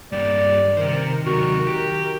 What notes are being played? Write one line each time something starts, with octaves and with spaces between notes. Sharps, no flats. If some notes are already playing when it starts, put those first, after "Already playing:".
G2 G3 A#3 D5
C3 D#3 A#4 C5
C3 F#3 F#4
G4